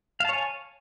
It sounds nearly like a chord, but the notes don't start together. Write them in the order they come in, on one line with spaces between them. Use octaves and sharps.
F5 A5 C#5 G#5